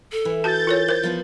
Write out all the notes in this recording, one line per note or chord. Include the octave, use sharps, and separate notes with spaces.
A4
E3
F#4 A5 G6 A6
F4 A#4 C#5
A#4 C5
F3 B3